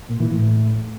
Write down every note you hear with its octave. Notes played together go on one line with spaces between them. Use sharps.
A#2
E3
A2